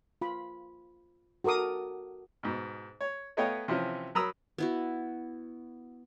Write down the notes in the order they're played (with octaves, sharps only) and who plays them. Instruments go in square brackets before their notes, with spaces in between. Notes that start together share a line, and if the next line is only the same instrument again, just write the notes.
[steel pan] F4 B5
F#4 A4 A#4 D6 D#6
[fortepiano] G#2 B2
C#5
A3 B3 C#5 D#5 F5 G5
C3 E3 F3 C#4
F#3 A#4 A#5 B5 D#6 E6
[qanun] B3 E4 F#4